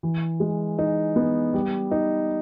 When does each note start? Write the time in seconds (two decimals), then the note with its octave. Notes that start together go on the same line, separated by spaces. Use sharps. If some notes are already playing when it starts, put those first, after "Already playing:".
0.03 E3
0.40 G#3
0.79 D#4
1.16 B3
1.53 G3
1.91 D#4